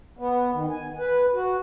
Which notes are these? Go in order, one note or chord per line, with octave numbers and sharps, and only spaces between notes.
B3
D#3
G#5
B4
F#4